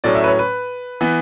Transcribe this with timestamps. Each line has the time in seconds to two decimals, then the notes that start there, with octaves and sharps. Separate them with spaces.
0.04 A2 F#3 A3 C#4 D5
0.15 E5
0.24 B4
0.28 C#5
0.39 B4
1.01 E3 B3